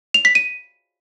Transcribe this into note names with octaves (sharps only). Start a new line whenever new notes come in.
F7
B6
D#7